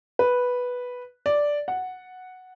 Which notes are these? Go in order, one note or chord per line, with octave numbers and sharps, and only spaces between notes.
B4
D5
F#5